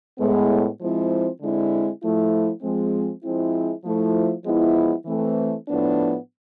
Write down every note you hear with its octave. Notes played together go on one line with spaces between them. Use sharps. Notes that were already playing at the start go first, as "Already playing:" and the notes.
A2 G#3 B3
F3 G#3 C4 E4
D3 G#3 C4 E4
F3 A3 E4
F3 G#3 C4
F3 G#3 C4 E4
F3 A3 E4
F3 G#3 B3 E4
E3 A3 C4
A2 F3 B3 D4